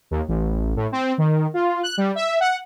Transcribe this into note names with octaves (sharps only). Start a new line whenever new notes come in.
D#2
A1
A2
C4
D#3
F4
F#6
G3
E5
F#5